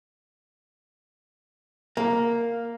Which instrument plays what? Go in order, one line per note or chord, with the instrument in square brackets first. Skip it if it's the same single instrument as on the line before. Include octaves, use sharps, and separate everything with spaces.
[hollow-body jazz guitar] A#3